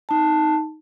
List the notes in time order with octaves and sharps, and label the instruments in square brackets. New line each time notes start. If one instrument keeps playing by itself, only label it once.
[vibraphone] D#4 A5